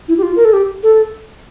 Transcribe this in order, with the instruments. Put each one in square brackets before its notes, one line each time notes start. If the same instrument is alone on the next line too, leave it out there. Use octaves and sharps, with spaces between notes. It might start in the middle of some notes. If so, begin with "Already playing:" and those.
[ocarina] E4
G4
F4
A#4
A4
G4
A4